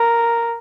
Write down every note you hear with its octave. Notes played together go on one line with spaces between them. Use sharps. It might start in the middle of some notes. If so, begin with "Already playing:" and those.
Already playing: A#4